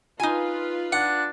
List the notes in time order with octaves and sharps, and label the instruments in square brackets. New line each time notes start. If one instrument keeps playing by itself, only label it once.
[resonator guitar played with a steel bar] D#4 G#5 [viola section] F4 B4
[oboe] D4 [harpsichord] F#5